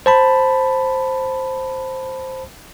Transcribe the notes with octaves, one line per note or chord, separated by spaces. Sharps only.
C5 A5 B5